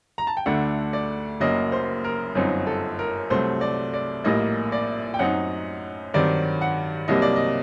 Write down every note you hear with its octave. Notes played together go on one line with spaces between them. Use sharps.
A#5
A5
G5
D2 D3 A3 D4 F#5
D5
F#1 F#2 F#3 A#3 D#5
C5
A#4
G1 F#2 F#3 C4 D#4
A4
A#4
C2 C3 F#3 A3 C5
D5
D5
A#1 A2 G3 A#3 D#5
D5
G5
F#2 F#3 C4 D#4 F#5
G2 D#3 F#3 C4 D5
F#5
C2 C3 F#3 A#3 D#5
D5
D#5